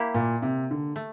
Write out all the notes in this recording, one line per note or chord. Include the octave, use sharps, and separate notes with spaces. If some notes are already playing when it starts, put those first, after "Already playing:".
Already playing: A#3 E4 G4
A#2
C3
D3
A3